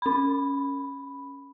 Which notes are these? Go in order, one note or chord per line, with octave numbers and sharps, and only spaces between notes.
C#4 B5